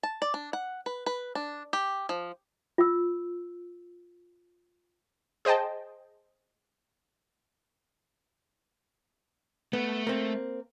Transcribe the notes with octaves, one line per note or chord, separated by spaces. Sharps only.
A5
D5
D4
F#5
B4
B4
D4
G4
F3
F4 E6
G#4 C5 D#5 G5 A5
A3 B3
A#3 C4